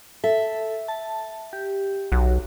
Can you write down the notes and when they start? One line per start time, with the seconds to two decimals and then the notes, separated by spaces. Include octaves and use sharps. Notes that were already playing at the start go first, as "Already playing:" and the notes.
0.24 A4 E5
0.88 A5
1.53 G4
2.12 B1 F#4